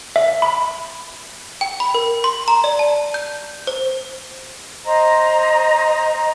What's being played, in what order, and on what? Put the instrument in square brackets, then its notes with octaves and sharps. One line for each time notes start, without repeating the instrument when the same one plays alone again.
[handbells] E5
B5
[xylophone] G5
B5
A#4
C6
A#5
D5
A5
G6
C5
[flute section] C5 D#5 A#5